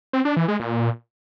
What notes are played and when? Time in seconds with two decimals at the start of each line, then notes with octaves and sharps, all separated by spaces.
0.13 C4
0.25 D4
0.37 E3
0.48 G#3
0.60 A#2